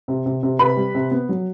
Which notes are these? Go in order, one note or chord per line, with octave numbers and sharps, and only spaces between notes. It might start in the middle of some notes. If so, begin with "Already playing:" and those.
C3
C3
C3
C3 B4 B5
G3
C3
B3
F#3